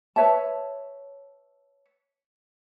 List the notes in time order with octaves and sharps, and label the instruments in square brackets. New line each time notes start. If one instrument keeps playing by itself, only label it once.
[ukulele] B4 C#5 E5 A5